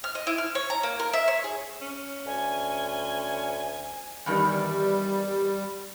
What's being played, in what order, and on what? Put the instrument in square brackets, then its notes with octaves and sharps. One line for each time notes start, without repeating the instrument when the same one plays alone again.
[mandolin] F6
D#5
E4
F6
C#5
A#5
A#3
A#4
E5
C#5
G#4
[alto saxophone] C#4
[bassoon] D2 [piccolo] G#5
[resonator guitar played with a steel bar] E2 G2 D#3 [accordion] G3